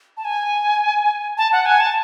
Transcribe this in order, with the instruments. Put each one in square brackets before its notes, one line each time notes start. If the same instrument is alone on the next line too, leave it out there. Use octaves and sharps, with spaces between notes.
[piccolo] A5
G#5
A5
F#5
G#5
A5